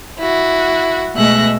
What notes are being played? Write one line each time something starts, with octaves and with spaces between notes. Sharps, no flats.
E4 F#4
B2 G#3 A3 E5 F#6 A#6